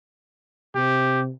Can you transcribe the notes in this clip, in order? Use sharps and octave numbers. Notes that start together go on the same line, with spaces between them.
C3 G4